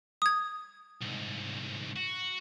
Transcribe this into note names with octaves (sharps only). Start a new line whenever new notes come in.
D#6 G#6
C2 G#2
F#4